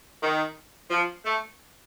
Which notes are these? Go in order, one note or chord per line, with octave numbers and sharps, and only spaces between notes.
D#3
F3
A3